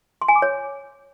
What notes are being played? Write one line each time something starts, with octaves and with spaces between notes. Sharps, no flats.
C6
G#5
D6
C#5